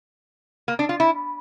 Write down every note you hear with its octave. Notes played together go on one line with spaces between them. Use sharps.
A#3
D4
F4
E4